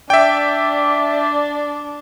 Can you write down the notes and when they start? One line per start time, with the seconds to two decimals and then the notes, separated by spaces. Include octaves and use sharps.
0.10 D4 D5 E5 G5